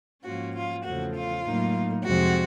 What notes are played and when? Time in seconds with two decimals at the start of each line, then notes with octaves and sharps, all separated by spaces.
0.24 G#2 F3 A#3 C#4 F4 F#4
0.55 F4
0.84 E2 C#3 F3 A3 F#4
1.15 F4
1.45 A2 F#3 A#3 D#4
2.04 F2 C3 F3 G#3 C4 F#4